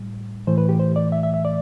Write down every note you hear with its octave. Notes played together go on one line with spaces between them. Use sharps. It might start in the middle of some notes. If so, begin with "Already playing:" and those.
Already playing: A2 G3
A2 E3 A3 C5
B4
G4
C5
D5
E5
E5
E5
D5